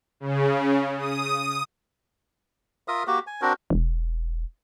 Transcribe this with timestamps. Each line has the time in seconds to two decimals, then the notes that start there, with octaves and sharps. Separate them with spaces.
0.20 C#3
0.98 D#6
2.88 F4 A#4 E5 D#6
3.07 A#3 F#4 G4
3.27 G#5
3.42 C4 D4 F#4 A#4
3.70 E1